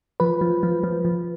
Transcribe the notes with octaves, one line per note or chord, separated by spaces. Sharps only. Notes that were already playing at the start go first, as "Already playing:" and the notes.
F3 B4
F3
F3
F3
F3